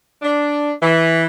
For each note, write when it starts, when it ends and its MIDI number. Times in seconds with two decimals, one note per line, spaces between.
0.22 0.71 62
0.82 1.25 52